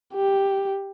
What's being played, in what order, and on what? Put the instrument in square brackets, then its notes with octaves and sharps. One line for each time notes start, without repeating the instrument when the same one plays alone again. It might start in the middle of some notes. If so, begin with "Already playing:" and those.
[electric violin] G4